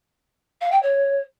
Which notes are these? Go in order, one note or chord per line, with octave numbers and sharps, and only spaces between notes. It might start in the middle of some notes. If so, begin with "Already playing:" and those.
F5
G5
C#5